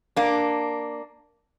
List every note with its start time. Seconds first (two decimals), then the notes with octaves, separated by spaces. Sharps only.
0.16 A#3 D4